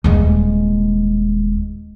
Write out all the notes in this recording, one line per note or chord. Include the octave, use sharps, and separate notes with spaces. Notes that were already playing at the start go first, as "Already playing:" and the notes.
D#1 G#3